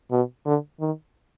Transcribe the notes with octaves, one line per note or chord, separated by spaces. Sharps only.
B2
D3
D#3